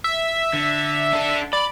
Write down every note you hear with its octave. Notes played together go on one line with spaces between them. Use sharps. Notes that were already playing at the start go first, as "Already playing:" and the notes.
E5
D3
D4 A4
D5 B5